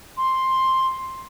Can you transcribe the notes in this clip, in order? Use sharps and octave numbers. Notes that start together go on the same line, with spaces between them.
C6